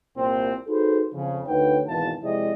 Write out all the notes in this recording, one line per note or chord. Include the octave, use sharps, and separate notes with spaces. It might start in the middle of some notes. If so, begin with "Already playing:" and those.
C2 A#2 C4
D#4 F#4 G#4 A4 B4 C5
F2 C#3
D2 D#4 B4 C#5 F#5 G5
G#1 E2 B2 E3 F5 A5
F2 C3 G#3 E4 D5 D#5